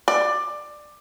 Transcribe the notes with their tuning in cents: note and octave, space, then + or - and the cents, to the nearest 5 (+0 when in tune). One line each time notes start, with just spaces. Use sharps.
D5 +15